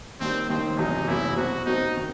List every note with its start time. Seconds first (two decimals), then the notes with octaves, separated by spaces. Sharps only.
0.20 D#2 D#3 G3 C4
0.49 D#2 D#3 G3 C4
0.78 F#1 E2 C3 F#3 D#4
1.08 F#1 E2 C3 F#3 E4
1.36 B2 F#3 C4 F#4
1.65 B2 F#3 C4 D#4
1.97 D#3